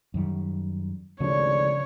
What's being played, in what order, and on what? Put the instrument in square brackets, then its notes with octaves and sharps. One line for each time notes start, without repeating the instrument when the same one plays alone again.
[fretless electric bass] F#2 D#3 G3
[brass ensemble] G#1 D2 D5 [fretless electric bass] C#3 F3 C#4 [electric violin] C#5